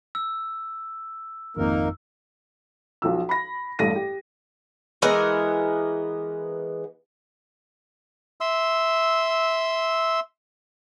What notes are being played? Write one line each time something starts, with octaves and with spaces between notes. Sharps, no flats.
E6
G#1 F2 A#3 D#4 A#4
B1 F3 E6
B5 A#6
A1 G2 A4 A#6 D#7
G4
E3 G#3 B3 A#4
E5 C6 E6